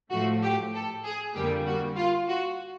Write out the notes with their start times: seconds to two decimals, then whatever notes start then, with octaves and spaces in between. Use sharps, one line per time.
0.11 A2 F3 A3 F#4
0.43 G4
0.74 A4
1.04 G#4
1.35 F2 D3 G3 A#3 G4
1.67 F#4
1.97 F4
2.29 F#4